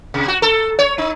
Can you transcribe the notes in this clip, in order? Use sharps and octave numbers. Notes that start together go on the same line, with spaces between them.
C3
F#4
A4
C#5
D#4